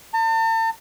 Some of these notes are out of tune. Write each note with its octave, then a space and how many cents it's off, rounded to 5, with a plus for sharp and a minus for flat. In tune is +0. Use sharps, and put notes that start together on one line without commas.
A5 +40